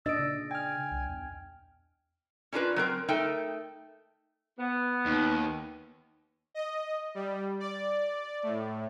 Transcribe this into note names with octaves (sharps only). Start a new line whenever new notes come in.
A#2 D4 D#5 E6 A6 D7
C#3
G5 G#5 F6
C2
E2
C#4 D4 F4 A#4 B4
F#3 C4 A#4
A3 D#4 A4 A#4 G5
B3
D#2
D#5
G3
D5
A2